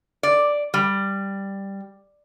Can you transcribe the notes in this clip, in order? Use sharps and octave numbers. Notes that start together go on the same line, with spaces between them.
D5
G3